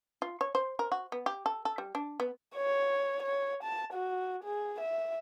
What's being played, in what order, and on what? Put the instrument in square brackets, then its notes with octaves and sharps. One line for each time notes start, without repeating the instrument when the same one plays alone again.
[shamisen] F4
C#5
C5
A#4
F#4
B3
G4
A4
A4
G3
D4
B3
[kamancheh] C#5
C#5
A5
F#4
G#4
E5